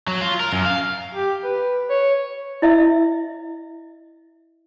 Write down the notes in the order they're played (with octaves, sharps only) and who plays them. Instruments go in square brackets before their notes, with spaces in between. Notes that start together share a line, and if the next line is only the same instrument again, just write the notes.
[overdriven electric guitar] F#3
F4
A#4
F#2
F5
[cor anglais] G4
B4
C#5
[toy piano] E4 D#5 E5